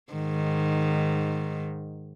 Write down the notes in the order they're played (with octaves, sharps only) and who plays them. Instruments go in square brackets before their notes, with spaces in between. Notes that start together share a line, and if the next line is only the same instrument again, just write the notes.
[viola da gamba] G#2 D#3